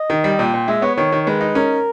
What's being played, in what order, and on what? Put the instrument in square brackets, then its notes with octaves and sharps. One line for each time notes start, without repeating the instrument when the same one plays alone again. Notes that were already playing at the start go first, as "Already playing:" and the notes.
Already playing: [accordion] D#5
[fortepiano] D#3
G3
[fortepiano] A#2 [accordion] G5
[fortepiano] A#2
[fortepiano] G#3 [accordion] E5
[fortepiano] B3 [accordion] C#5
[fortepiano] D#3 [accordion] C#5
[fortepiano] D#3
[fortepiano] G#3 [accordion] B4
[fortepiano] D#4
[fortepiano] C#4 [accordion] A#4